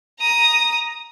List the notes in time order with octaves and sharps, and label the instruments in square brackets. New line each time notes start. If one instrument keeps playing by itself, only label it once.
[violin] A#5 D#6